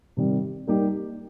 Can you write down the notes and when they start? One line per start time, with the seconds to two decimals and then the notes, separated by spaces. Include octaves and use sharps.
0.17 C3 D#3 G3
0.67 G3 A#3 D#4 G4